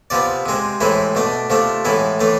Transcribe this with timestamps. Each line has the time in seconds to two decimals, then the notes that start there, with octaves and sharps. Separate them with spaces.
0.10 C3 F3 B3 D5
0.46 C3 G#3 C4
0.81 A2 E3 G#3 C4 E4
1.15 B2 A3 D4
1.50 C3 F3 A3 D4
1.85 A2 E3 G#3 B3 E4
2.20 A2 E3 A3 D4